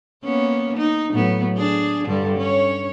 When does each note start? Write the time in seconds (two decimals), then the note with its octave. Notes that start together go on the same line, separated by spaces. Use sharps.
0.24 A#3 B3 C#4
0.77 D#4
1.12 A2 F#3 B3
1.58 D4 G#4
2.07 G2 D3 G3
2.37 C#4 C#5